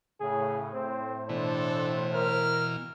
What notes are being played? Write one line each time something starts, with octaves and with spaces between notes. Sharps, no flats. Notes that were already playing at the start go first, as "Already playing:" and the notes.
A2 C#3 G#4
A2 C4 C5
B2 E3 D4 A4
A#4 F6